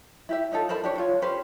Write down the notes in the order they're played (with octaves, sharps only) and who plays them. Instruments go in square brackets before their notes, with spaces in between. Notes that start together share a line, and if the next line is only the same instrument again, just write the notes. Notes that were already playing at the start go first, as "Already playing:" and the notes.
[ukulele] E4 G4 E5
C#4 D#4 F4 A4
A#4 C5 A5 B5
D4 G4 C#5
F4 C#5
C#4 G4 B4 C5